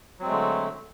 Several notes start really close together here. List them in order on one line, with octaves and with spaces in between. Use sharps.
F#3 C4 G#3 A3 D3